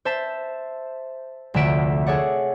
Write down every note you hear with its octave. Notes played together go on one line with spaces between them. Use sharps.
C5 E5 A5
F1 D2 D3 E5 D7
G#4 A4 C#5 D5 F#5